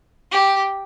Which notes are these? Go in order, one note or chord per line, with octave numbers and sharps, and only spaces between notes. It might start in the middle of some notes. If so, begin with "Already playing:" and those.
G4